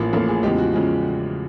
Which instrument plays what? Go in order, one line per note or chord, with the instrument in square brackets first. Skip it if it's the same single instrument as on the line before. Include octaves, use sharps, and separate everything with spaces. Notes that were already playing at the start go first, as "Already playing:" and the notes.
Already playing: [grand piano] A1 A2 F3 A#3
A1 A2 F3 A#3 A4
G#4
E2 C#3 F3 G#3 G4
F#4
C#3 F3 G#3